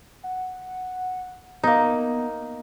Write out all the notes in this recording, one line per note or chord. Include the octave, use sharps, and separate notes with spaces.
F#5
A#3 B3 D#4